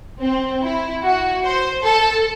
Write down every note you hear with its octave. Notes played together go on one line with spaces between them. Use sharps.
C4
E4
F#4
C5
A4